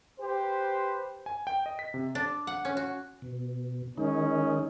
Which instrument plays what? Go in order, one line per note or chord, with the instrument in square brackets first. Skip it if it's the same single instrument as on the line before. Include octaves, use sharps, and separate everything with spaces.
[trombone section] G4 B4 C5
[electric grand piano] G#5
G5
D#5
B6
C3
[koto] D4
F#5
C#4
F#4
[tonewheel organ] B2
[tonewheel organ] D#3 G#3 D#4 [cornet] C#4